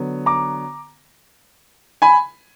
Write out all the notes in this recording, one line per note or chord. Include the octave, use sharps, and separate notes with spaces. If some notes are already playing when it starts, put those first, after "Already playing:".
Already playing: D3 F#3 B3
A#5 D6
G#5 B5